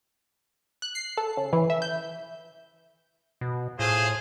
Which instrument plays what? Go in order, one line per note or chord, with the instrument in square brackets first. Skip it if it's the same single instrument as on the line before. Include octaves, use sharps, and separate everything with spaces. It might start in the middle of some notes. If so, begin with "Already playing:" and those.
[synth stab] F#6
C7
A4
C#3
E3
E5
G6
[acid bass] B2
[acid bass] A2 [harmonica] F4 G#4 C5